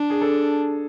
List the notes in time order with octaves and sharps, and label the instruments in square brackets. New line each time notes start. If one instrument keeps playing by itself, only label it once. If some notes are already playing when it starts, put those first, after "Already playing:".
Already playing: [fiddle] D4
[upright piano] G#4
A4